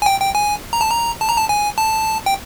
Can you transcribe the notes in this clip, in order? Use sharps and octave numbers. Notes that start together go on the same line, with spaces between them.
G#5
G5
G5
G#5
A#5
A5
A#5
A5
A#5
A5
G#5
A5
G5